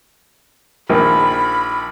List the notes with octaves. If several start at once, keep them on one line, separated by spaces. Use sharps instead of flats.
A#1 D#3 F3 B5